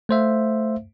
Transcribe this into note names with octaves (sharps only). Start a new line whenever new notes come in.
A3 C5 E5 F5